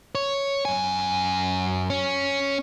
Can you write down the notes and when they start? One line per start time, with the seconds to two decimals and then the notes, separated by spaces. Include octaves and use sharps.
0.15 C#5
0.65 F#2 G#5
1.90 C#4